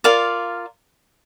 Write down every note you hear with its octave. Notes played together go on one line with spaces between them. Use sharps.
F4 A#4 D5 F5